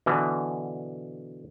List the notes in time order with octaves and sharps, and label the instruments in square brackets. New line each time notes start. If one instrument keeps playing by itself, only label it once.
[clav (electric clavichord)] B2 D3 E3